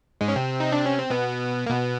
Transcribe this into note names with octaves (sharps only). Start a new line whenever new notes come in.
G#2 G#3
C#4
C3 C4
D#4
D4
C#4
C4
B2 B3
A#3
B2 B3